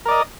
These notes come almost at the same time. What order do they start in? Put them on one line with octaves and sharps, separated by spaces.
A#4 D5 D#5